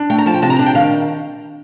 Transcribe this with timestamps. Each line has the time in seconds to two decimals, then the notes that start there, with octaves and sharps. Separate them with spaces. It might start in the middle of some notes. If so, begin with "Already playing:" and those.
Already playing: D4
0.10 A3 G5
0.18 A#5
0.26 F3 A5
0.34 G5
0.42 C3 A5
0.50 A#5
0.59 D4 A5
0.66 G5
0.75 D#3 F5